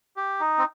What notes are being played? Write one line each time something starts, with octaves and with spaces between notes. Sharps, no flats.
G4
D#4
C4